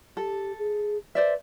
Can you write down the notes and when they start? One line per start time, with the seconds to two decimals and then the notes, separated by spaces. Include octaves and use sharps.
0.17 G4 A4
0.58 G#4
1.15 B4 C5 D5 E5